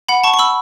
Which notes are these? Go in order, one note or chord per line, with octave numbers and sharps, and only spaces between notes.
F#5 B5
A5 C#6
C#6
B5 E6